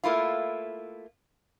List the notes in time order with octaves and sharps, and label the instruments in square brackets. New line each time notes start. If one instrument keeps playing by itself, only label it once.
[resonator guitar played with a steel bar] A3 A#3 E4 F4